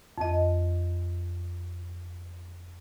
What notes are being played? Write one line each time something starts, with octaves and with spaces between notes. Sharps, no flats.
F2 D#5